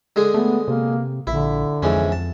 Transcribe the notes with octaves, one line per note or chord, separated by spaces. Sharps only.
D3 G#3 G#4
A3 B3
C3 A#3
A#1 D3 E4
F2 G#2 E3 C#4
A5